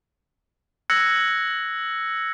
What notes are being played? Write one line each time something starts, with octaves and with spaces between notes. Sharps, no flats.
E6 F#6 G#6 A#6 C#7